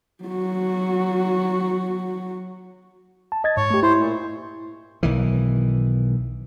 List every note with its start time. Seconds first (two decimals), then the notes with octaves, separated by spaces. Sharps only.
0.24 F#3 F#4
3.32 A5
3.44 D#5 G#6 A6
3.57 G#2 C#5
3.71 A3 G4
3.83 E4 C5
3.99 A#2
5.03 B1 D#3 E3